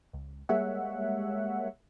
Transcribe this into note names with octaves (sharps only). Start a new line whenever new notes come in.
C#2
G3 G#3 A#3 C#5 E5 F#5